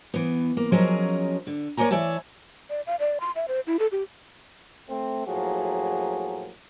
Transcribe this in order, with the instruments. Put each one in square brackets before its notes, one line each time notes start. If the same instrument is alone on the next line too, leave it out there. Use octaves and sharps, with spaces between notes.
[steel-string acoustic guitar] E3 B3
A#3
F3 F#3 C#4 G#4 A#4 D#5
D3
A#3 C#5 D5 G#5 A#5
E3 C#5 D5 E5 G#5 A5
[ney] D5
F5
D5
C6
E5
C5
E4
A4
G4
[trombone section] A3 C4
A2 F3 F#3 A#3 F#4 G#4